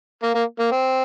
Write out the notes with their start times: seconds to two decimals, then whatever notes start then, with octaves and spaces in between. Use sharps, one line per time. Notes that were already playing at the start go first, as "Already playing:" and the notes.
0.23 A#3
0.35 A#3
0.59 A#3
0.72 C4